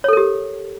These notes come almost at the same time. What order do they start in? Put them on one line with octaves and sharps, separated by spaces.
C#5 A4 A#4 G4